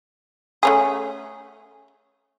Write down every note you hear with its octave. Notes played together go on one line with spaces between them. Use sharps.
A3 C#4 G#4